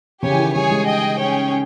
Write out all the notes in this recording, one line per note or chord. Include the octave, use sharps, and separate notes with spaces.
C#3 G4 C#5 G#5
E3
D#3
G3 G#4 C#5 G#5
G#3
G#4 D#5 G5
C#4 G#4 C#5 G5